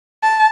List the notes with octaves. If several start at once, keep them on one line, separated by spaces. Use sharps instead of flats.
A5